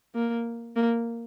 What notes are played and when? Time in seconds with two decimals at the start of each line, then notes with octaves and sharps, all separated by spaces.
0.15 A#3
0.76 A#3